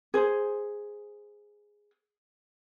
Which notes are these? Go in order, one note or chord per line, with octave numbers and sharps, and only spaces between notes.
G#4 C5